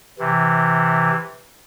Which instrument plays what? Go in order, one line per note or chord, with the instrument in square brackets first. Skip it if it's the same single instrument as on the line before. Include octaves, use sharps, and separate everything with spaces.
[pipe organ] C3 E3